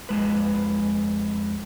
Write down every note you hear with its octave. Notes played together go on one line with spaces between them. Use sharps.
F2 G#3 B4